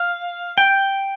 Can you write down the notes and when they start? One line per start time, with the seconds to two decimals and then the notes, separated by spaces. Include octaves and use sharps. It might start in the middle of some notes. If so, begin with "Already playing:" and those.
Already playing: F5
0.58 G5